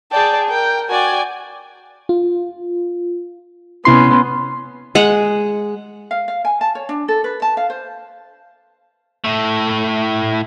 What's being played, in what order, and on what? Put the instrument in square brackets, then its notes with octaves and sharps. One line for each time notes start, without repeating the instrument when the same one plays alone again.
[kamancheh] G#4 G5 [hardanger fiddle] D5 A5
[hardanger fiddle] A#4 [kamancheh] G5
[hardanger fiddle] F#4 G5 [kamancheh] D5 G#5
[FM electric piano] F4
[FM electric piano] C3 E4 C7 [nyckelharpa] B3 C#4 [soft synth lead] C6
[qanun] G#3 F#5
[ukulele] F5
F5
G#5
A5
C#5
D4
A4
B4
A5
F5
C5
[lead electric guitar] A2 A3